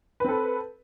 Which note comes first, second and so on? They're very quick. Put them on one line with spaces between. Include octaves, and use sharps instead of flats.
B4 C4 A4